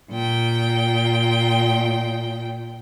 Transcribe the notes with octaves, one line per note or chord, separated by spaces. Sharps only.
A#2 G5